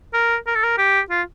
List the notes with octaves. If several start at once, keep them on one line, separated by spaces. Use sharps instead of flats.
A#4
A#4
A4
A#4
G4
F4